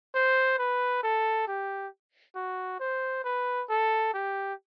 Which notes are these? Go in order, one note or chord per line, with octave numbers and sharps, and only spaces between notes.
C5
B4
A4
G4
F#4
C5
B4
A4
G4